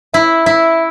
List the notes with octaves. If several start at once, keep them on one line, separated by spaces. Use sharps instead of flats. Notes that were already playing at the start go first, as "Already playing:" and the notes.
E4 E5
E4 E5